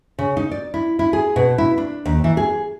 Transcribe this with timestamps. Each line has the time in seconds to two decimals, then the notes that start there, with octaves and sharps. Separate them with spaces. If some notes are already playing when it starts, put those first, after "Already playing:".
0.18 C#3
0.37 D#4
0.51 D5
0.74 E4
0.99 E4
1.13 G#4
1.36 B2
1.58 E4
1.78 D4
2.05 D#2
2.24 E3
2.37 G#4